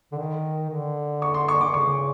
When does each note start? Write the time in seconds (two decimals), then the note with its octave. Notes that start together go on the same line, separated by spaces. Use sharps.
0.12 D3
0.18 D#3
0.70 D3
1.22 C#6
1.34 C6
1.48 C#6
1.61 D3 D6
1.73 C#3 C#6